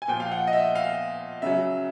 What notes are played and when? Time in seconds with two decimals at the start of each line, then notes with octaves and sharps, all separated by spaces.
0.02 G#5
0.08 A#2 F3 G5
0.20 F5
0.32 F#5
0.47 D#5
0.53 E5
0.75 F5
1.42 C#3 F#3 E5